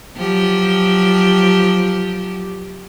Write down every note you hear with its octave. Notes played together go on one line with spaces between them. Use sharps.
F3 F#3 G4